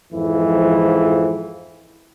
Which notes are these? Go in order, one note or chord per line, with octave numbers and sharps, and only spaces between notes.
F2 G#2 E3 F3